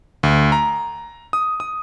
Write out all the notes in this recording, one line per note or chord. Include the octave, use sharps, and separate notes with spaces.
D2
A#5
D#6
D#6